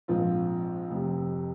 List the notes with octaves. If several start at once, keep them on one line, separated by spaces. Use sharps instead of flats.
A#1 G#2 F3 C4 F4
F1 F2 C3